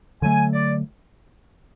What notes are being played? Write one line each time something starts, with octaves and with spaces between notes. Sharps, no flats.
D3 F#3 A3 G#5
D5